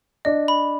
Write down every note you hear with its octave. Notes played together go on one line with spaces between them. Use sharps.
D4 D#5
B5